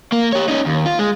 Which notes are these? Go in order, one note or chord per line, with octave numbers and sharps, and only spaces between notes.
A#3
G4 C#5
C#4 D#4
D#2
F4
G#3